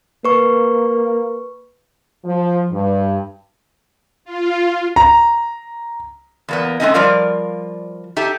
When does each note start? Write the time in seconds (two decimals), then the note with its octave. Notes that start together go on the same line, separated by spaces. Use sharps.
0.25 A#3 B4 C#6
2.25 F3
2.71 G2
4.25 F4
4.96 A#5
6.48 E2 A#3 B3
6.80 G#3 A3 C4 C#4 D#4 D#5
6.94 F3 G3 F4 A#4 D5 F5
8.16 D#4 G4 A4 E5